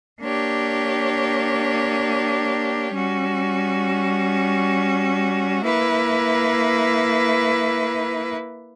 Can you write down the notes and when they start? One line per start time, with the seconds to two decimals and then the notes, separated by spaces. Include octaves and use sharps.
0.22 A#3 D4 G4 C#5
2.93 G3 C#4 F#4
5.63 A#3 E4 B4